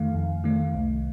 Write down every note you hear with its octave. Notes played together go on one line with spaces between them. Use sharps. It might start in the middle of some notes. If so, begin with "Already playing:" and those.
Already playing: F2 D#3 A3 F5
F2
D#3 A3
C2